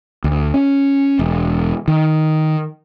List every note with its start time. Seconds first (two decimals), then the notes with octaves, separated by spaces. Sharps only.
0.24 D2
0.54 C#4
1.19 E1
1.88 D#3